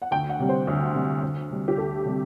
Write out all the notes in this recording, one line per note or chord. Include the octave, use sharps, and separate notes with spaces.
F#5
D2 G5
F#5
C3 G3
C5
D2
C3 G3
D2
C3 G3
G4
D2 A4
C3 G3